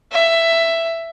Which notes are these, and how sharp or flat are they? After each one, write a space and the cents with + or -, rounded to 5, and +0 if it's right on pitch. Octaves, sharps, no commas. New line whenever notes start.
E5 +10